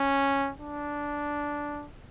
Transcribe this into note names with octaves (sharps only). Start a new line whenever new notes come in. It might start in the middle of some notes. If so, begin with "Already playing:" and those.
Already playing: C#4
D4